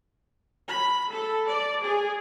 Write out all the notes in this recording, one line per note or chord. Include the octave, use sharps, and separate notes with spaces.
B5
A4
D5
G#4